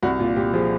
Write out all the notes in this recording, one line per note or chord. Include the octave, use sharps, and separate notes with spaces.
C2 F#4
A#2 F4
A#2 G4
F3 G#4